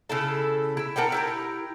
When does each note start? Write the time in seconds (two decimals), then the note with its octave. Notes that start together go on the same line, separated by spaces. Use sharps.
0.09 C#3 E4 A4
0.77 E4 E5
0.96 D4 A#4 F#5 G5
1.12 E4 G4 A#4